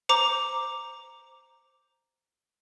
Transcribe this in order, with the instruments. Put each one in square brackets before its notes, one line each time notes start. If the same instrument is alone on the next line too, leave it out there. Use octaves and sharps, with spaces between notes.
[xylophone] C5 A#5 D6